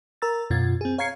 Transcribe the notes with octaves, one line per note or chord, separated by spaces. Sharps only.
A#4 A#5 E6 A6
F#2 B2 F4 G#6 A6
C4 G#4
C#5 F5 A#5 G#6 C7 C#7